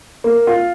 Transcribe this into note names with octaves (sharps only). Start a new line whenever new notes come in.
A#3
F4